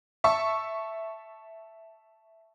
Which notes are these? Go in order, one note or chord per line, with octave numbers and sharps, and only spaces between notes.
E5 A5 C#6